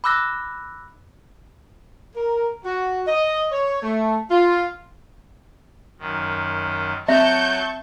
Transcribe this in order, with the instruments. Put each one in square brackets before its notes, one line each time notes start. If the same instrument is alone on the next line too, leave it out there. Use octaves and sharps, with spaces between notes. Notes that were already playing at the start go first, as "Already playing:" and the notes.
[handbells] B5 D6 E6 F#6 A#6
[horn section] A#4
F#4
D#5
C#5
A3
F4
[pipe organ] F#2 D#3
[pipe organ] F#3 [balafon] C4 [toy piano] E5 [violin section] A5 C#6 G6